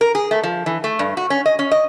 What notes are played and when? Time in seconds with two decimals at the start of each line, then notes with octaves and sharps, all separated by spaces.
0.01 A#4
0.15 G#4
0.31 A3
0.43 F3
0.66 E3
0.84 A3
0.99 G2
1.17 F#4
1.30 C#4
1.46 D#5
1.59 C#4
1.71 D#5